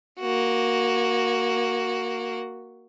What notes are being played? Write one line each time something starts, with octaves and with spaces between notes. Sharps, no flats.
A#3 F#4